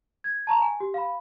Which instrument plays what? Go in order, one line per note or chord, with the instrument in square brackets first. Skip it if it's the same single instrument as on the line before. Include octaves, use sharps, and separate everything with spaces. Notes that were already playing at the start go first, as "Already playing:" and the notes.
[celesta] G#6
A5 A#5 C#6
G#5
G4
F5 B5